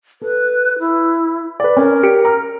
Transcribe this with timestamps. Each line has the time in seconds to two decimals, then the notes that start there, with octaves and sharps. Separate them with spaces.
0.22 A4 B4
0.79 E4
1.60 B4 D5
1.77 C#4 A#4 D5
2.03 G4 C#7 D7
2.25 A#5 F6